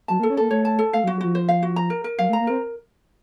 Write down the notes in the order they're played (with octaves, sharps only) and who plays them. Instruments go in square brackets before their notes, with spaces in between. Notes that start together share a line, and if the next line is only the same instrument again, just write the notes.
[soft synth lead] F#3 [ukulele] A5
[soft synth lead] A#3
[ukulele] A4
[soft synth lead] C#4
[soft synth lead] A#3 [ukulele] A4
[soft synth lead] A3 [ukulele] C#5
[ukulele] A5
A4
[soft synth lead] A3 [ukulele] F5
[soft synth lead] F#3
[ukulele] F#4
[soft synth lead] F#3
[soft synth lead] F3 [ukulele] F#4
[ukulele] C5
F5
F#4
A#5
A#4
A#4
[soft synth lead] F#3 [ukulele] F5
[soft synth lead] A3
[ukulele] A#5
[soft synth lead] A#3
[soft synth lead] C4 [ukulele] A#4